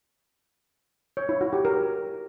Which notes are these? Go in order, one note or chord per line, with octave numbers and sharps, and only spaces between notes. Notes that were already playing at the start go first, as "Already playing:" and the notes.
C#5
E4
F#4
G4
A#4